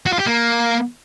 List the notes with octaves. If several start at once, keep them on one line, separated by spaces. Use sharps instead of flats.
F#4
F4
G4
A#3